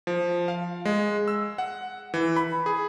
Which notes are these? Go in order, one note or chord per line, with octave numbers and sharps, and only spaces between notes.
F3
F5
G#3
E6
F#5
E3
B5
G#4